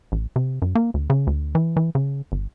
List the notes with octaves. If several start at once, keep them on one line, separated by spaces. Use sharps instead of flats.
A1
C3
F#2
A#3
D2
C#3
D2
E3
E3
C#3
G1